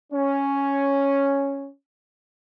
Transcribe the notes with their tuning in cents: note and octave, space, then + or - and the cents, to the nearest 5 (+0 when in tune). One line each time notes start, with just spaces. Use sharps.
C#4 +0